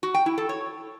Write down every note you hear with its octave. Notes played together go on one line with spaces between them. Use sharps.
F#4
G5
E4
A4
C#5